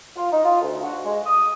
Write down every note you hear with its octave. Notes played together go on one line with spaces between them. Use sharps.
F4
D#4
F4
D2
F#4
G#3
D#6